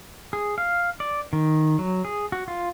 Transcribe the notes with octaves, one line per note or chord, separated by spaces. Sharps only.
G#4
F5
D5
D#3
F#3
G#4
F#4
F4